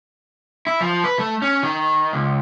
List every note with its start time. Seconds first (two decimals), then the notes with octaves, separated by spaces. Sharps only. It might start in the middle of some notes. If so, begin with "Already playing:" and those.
0.67 E4
0.81 F3
1.04 B4
1.19 A3
1.42 C#4
1.63 D#3
2.13 C#2